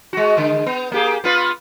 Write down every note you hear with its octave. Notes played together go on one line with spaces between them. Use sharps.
G#3 F#4
D3 G#3
B3
A#3 G4 G#4
B3 F4 B4